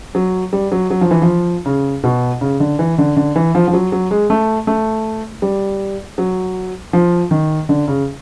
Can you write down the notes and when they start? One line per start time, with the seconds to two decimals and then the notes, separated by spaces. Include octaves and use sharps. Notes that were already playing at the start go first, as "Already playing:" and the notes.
0.15 F#3
0.53 G3
0.72 F#3
0.90 F#3
1.01 F3
1.11 E3
1.22 F3
1.66 C#3
2.04 B2
2.41 C#3
2.60 D3
2.79 E3
2.98 D3
3.17 D3
3.36 E3
3.55 F3
3.68 F3
3.73 F#3
3.92 F#3
4.11 G#3
4.30 A3
4.67 A3
5.42 G3
6.18 F#3
6.93 F3
7.31 D#3
7.69 D3
7.88 C#3